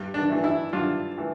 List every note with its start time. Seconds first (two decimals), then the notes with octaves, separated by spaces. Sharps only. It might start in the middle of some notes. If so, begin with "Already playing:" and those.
Already playing: G2
0.14 D4
0.30 E3 A3
0.44 E4
0.73 G2 D4 F4
1.18 E3 A3